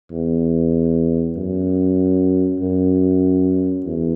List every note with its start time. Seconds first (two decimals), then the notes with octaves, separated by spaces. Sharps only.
0.11 E2
1.36 F#2
2.60 F#2
3.85 E2